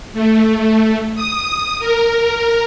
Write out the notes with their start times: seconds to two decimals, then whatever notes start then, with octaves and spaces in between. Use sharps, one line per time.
0.13 A3
1.15 D#6
1.79 A#4